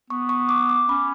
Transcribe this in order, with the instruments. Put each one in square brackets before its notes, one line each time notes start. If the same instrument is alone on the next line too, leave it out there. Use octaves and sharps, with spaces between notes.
[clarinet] B3 [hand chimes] C#6
[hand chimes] C#6
D6
D6
[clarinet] C#4 [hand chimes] B5